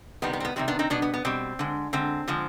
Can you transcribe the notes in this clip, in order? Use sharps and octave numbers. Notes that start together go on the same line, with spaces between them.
C3 D#3 G3 B3
B3
C4
B3
C3 D#3 G3 C4
B3 D4
C4 D#4
B2 G3 B3 D4
B3
B3
B2 G3 C4
D3 G#3
D3 G#3 C4
D3 F3 G#3